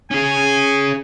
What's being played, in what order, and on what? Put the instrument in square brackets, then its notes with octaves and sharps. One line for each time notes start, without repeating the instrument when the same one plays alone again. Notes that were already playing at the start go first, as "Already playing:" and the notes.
[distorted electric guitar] C#4 G#4 [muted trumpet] G#5